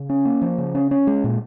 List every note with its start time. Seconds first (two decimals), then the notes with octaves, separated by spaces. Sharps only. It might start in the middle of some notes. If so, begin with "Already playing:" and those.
Already playing: C#3
0.10 C#4
0.25 A#3
0.42 F3
0.58 C#3
0.75 C#4
0.91 C#4
1.07 G#3
1.24 A#2